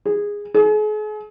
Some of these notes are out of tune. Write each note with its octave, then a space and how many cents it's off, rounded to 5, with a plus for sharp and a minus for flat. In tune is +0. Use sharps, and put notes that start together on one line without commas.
G#4 -15
G#4 +40